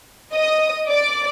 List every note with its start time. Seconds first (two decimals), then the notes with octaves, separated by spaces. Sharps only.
0.34 D#5 D#6
0.89 D5 D6